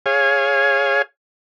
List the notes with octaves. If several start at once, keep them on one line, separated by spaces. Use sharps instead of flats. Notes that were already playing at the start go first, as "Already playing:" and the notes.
G#4 C#5 F5 G#5